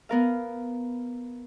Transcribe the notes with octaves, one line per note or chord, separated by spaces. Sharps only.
B3 A#4 F5